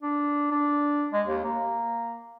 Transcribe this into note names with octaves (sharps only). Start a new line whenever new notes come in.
D4
D4
G#3
D#2
A#3